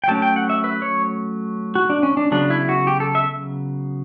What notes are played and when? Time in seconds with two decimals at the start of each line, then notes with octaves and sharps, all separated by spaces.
0.04 G5
0.08 F#3 A3 C#4 A5
0.22 G5
0.36 F#5
0.50 E5
0.64 B4
0.82 C#5
1.75 F#4
1.90 D4
2.03 C#4
2.17 D4
2.31 C#3 F#3 B3 D4
2.50 E4
2.69 F#4
2.87 G4
3.00 A4
3.15 E5